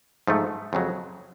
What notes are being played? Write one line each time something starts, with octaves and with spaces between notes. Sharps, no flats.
G#2 F3 A3
F2 C#3 F#3